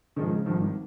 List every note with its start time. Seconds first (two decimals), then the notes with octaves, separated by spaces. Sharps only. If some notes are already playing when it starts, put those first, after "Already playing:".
0.16 G#2 D#3 F3 G#3 C#4
0.31 C#3
0.46 G#1 G2 D#3 F3